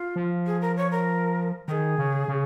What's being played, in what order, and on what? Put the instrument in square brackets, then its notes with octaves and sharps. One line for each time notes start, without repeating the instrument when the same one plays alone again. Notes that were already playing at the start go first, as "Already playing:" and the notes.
Already playing: [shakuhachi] F4
[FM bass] F3
[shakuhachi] G#4
A#4
C#5
A#4
[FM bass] D#3 [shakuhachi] G#4 A#4
[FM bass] C#3
C#3